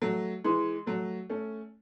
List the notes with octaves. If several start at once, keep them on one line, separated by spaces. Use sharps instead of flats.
F#3 A3
E3 G#3
F#3 A3
A3 C#4